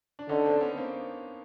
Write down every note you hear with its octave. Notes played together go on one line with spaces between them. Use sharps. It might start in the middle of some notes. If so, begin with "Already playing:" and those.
D4
D3 C#4 D#4
C4 D4
B3 C#4
A#3 C4